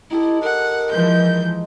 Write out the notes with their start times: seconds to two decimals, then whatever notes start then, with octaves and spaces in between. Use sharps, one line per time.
0.11 D#4 E4 G4 A4
0.43 A#4 F#5
0.92 E3 F3 G#3 G6